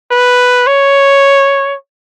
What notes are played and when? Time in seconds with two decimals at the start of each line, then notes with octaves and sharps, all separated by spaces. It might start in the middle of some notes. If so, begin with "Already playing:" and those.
0.11 B4
0.67 C#5